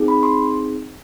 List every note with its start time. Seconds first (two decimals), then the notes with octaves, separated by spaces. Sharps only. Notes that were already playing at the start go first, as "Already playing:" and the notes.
Already playing: C4 D#4 G#4
0.08 B5
0.23 C6